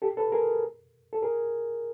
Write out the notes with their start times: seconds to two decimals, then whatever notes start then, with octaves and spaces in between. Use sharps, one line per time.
0.02 G4 A4
0.17 A4 B4
0.32 G#4 A#4
1.13 A4
1.22 G#4 A#4